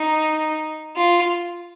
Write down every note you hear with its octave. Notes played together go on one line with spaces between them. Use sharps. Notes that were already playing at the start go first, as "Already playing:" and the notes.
Already playing: D#4
F4